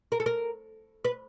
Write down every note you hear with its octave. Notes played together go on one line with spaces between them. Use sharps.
A#4
A4
A#4
B4